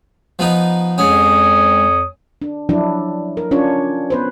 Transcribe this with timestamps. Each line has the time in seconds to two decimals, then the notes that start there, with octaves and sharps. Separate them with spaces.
0.39 F3 B3 D#4
0.98 F2 G#2 C#4 C#5 D#6
2.42 D4
2.69 F3 F#3 D4 E4
3.37 A#4
3.51 C#4 D4 F4 C#5
4.10 B3 B4 C5